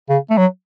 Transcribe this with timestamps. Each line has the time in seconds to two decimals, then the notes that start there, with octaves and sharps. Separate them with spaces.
0.10 C#3
0.30 A3
0.38 F#3